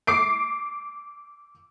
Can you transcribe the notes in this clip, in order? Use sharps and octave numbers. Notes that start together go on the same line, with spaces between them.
D6 C7 D7